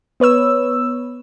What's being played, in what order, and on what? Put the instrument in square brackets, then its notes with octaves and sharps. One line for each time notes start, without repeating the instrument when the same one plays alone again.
[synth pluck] B3 B4 C#5 E6